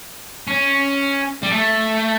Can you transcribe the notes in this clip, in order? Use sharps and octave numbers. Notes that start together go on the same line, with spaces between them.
C#4
G3
A3